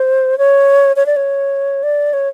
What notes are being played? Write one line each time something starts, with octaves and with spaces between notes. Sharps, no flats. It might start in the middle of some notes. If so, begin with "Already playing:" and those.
Already playing: C5
C#5
C#5
D5
C#5
D5
C#5